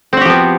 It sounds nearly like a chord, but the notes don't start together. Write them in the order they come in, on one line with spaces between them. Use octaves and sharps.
C4 F#4 G4 F3 B3